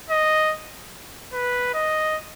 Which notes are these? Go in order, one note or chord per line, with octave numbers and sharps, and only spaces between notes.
D#5
B4
D#5